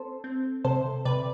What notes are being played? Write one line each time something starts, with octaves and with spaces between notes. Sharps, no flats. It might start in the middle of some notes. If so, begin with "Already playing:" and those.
Already playing: C4 A4 C5
C4
C3 A4 C5
C3 B4 D5